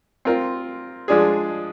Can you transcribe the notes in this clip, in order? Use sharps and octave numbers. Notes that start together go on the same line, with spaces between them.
C4 F4 A#4
F3 G#3 D4 G#4